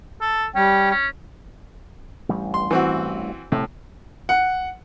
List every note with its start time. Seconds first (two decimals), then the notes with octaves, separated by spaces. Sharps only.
0.21 A4
0.55 G3 C#4 G5
0.91 C#4
2.29 A1 G2 G3
2.54 C6
2.71 E3 C4 F#4
3.52 A2 C3
4.29 F#5